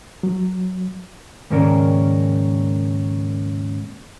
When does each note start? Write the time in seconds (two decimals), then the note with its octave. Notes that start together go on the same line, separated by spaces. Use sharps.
0.23 F#3
1.50 D#2 G#2 C#3 C#4 A#4 D5